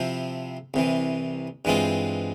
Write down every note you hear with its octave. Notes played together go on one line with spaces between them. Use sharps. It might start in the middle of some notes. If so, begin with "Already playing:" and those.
Already playing: C3 F3 C4 E4
C2 C3 E3
G2 E3 G#3 C4 F4